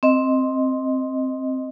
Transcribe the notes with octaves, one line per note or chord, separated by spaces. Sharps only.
C4 D#5